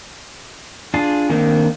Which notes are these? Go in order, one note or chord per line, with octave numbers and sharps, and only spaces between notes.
D4 F4 G#4
D#3 A#3 C4 D4 D#4